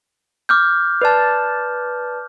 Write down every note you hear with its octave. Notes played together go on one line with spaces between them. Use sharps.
D6 F6 G6
B4 D5 A5